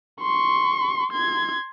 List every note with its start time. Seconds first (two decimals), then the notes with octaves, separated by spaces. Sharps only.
0.22 C6 C#6
1.11 C6 G#6